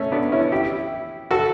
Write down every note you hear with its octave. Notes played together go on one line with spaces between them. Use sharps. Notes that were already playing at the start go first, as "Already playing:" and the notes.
Already playing: A3 C#4
B3 D4
C#4 E4
E4 G4
F#4 A4